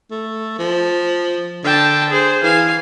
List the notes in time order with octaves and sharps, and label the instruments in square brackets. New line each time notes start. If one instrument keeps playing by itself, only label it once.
[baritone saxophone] A3
F3
[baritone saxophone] D3 [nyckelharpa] G5 A5
[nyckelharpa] G#4 C5
[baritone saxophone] E3 [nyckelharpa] F5 G#5